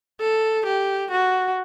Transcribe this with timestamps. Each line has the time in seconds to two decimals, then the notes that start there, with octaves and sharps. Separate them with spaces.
0.20 A4
0.65 G4
1.10 F#4